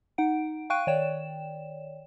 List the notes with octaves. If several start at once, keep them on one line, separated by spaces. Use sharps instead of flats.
D#4 F#5 D7
F5 G5 C#6 F#6 D7 D#7
D#3 C#5 D5 G5 E7